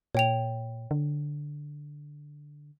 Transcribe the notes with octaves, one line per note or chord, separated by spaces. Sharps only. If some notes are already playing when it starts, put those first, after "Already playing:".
A#2 C#5 G5 F7
D3